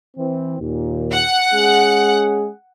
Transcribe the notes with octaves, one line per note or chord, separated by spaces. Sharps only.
E3 C4
D#2 A#2
F#5
G#3 C#4 G#4